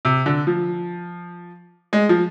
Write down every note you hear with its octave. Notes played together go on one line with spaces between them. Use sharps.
C3
D3
F3
G#3
F3